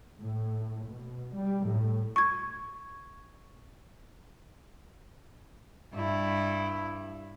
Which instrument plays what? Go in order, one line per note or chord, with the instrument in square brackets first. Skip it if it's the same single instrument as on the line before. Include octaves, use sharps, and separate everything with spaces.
[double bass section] A2
B2
G3
A2
[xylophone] C#6 G#6
[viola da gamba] G2 E4